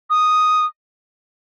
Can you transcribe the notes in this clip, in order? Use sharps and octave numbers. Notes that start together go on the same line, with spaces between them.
D#6